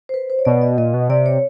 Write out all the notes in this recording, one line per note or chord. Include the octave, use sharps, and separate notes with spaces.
C5
B4
C5
C#5
B2 D5
D#5
A#2 D#5
B2
C3 D5
C#5